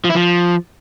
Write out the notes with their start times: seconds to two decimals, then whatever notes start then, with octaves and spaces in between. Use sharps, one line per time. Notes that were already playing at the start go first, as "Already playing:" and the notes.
0.04 F3
0.10 E4
0.15 F3